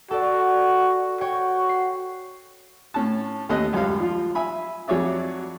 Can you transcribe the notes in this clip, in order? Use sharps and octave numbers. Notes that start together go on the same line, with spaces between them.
F#4 A4 D5
F#4 C#5 G5
C7
A2 C#4 A5
D#2 A3 C#4 D#5 D#6 F#6
C#2 F#2 G3 F5
F3 F4
E5 G#5 B5
F2 F#3 G#4 C#5 D5 E5